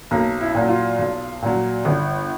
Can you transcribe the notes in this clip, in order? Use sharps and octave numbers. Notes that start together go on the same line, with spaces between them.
B1 A#3
E4
A#2 F#3
F4
B1
A#2 F#3
G1